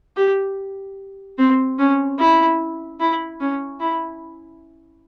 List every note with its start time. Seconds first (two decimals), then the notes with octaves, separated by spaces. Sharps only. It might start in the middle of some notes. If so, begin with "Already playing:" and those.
0.17 G4
1.38 C4
1.78 C#4
2.19 E4
3.00 E4
3.40 C#4
3.80 E4